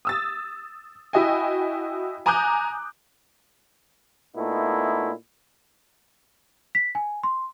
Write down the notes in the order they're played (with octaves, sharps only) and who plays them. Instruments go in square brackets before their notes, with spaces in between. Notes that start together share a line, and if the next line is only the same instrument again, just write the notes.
[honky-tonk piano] D#6 E6 A6
E4 F#4 D#5 G5 G#5
G#5 A#5 D6 D#6 F#6 G6
[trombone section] A#2 A3 B3 D#4 E4
[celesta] B6
G#5
C6